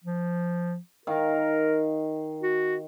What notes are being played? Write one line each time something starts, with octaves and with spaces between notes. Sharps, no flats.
F3
D#3 A#4 F5
F#4